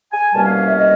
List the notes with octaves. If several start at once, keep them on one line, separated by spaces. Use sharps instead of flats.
G#5
C2 B2 G3 A#3 C#4 A5
F5
F5
E5
D#5